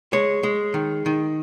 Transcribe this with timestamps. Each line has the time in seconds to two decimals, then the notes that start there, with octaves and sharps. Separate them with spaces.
0.13 G#3 C#5
0.43 G#3
0.74 D#3
1.06 D#3